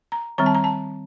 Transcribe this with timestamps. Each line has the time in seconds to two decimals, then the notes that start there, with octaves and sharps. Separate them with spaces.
0.12 A#5
0.38 D#3 G3 C4 A#5
0.46 A5
0.55 A#5
0.64 A5